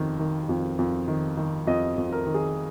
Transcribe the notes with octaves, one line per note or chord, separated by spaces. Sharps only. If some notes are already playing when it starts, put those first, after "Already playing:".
Already playing: F2 D#3
D#3
F2
F2
D#3
D#3
F2 D#5
F2
A#4
D#3
G#4